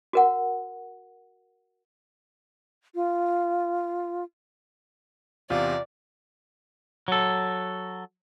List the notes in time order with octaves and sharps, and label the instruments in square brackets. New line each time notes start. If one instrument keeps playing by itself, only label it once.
[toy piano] F#4 A#4 F#5
[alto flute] F4
[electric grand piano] E2 C3 [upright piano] F4 [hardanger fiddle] D5
[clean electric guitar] F#3 A4